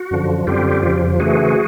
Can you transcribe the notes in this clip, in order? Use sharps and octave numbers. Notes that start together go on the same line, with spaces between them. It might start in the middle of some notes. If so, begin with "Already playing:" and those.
Already playing: F#4
F#2 D3 F3
F#2 D3 G3 C4 F4 G4
F2 C#3 F3
C#3 E3 A3 F#4 G#4